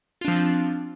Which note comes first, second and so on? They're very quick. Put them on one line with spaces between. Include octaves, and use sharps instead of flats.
F4 D4 F3 C4